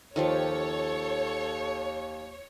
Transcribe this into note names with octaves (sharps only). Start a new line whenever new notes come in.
D#2 D#3 F3 G4 A4 C#5